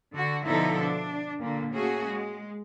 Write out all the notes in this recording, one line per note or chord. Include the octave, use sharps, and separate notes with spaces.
D3 F#4
B2 D3 F3 D#4 E4 A4
D4
A#2 D3 A#3
A3 A#3 C#4 F#4 G#4
G#3